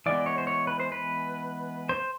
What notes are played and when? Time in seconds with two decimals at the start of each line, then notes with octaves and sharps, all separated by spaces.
0.06 E3 G#3 B3 D5
0.26 C#5
0.38 C5
0.47 C#5
0.67 B4
0.80 C5
0.92 B4
1.89 C5